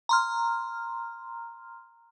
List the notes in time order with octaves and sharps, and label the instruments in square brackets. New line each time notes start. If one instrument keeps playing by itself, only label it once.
[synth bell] A#5 C6 F6